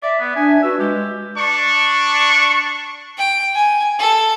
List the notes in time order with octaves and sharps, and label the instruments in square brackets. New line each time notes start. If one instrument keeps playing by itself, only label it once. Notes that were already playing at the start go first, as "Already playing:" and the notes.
[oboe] D5 [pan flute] E5
[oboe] B3
[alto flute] D4 [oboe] G#5
[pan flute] F#4 [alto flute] B4 [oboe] E6
[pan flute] G#3 [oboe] G4
[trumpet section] D4 C#6
[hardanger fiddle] G5
G#5
A4